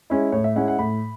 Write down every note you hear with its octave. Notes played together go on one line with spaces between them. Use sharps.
G#3 C#4 E4
A2 C#5
E5
G#3 C#4 E4 F#5
F#5
A2 B5